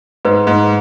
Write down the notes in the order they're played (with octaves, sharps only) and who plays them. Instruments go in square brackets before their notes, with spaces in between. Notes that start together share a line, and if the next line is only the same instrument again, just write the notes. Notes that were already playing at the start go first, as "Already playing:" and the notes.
[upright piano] G#2 [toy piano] B4
[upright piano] G#2